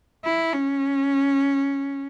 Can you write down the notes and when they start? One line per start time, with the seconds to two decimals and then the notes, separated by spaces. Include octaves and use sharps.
0.25 E4
0.53 C#4